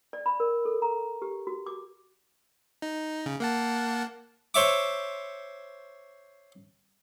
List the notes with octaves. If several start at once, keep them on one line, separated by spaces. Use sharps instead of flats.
D5
B5
A#4
A4
A#5
G4
F#4
D6
D#4
C#3
A#3 F#5 A5
C5 C#5 E5 D6